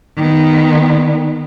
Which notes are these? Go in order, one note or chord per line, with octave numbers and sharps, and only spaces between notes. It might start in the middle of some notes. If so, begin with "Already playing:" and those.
D#3 B3